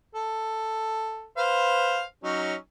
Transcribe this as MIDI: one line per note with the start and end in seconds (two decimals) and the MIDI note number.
0.15 1.28 69
1.37 2.03 71
1.37 2.03 72
1.37 2.03 77
2.24 2.54 54
2.24 2.54 61
2.24 2.54 63